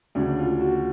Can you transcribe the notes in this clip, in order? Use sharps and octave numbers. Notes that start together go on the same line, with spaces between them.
D2 C#3 D4
F4
F#4